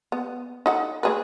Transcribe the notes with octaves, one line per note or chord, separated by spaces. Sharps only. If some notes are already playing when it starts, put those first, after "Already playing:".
B3
D#4 A4 F#5
A3 G#4 B4